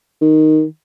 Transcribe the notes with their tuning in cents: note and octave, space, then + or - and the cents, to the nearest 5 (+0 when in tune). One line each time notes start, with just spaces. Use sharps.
D#3 -5